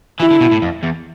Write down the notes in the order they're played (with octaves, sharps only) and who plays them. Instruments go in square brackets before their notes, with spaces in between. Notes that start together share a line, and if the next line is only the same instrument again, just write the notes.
[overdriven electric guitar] E3 [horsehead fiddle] E4
[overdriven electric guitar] D3
B2
A2
F2
E2